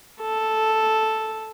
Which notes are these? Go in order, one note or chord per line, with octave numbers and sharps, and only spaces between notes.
A4